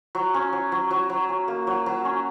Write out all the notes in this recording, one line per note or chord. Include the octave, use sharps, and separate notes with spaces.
F#3
C#4
F#3
F#3
F#3
F#3
C#4
A#3
F#3
F#3
C#4